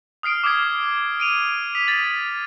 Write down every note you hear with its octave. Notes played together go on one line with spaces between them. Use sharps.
D#6 F6 C7 D7
D6 D#6 F6 G#6 C7
D7 D#7 F7
D#6 B6 F7
A6 F#7